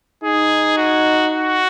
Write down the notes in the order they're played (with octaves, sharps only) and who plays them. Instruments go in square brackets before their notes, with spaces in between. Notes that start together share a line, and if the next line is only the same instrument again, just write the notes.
[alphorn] D#4 [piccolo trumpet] G#4
[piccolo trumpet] F#4
F#4